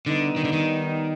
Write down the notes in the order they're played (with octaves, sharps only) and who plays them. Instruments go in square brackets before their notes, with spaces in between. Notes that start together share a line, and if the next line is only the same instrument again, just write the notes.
[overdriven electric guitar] D3 [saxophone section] G3 B3 D#4
[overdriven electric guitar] D#3
D3
D#3